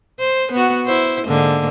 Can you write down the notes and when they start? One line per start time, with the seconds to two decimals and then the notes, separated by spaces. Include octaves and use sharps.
0.20 C5
0.52 B3 F#4
0.86 E4 C5
1.26 G#2 D3 A#3